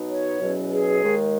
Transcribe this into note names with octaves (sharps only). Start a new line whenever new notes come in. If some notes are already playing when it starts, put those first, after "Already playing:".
Already playing: B2 F#3 B3 D#4
C#5
E2 B2 F#3 C#4
G#4
D#2 D#3 G#3